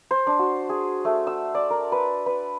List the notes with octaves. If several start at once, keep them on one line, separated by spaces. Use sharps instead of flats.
C5
D4
F#4
G#4
A3
E6
D5
A#4
B4
B4